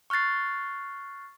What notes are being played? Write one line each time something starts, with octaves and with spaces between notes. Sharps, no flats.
C#6 F6 F#6 A6 C7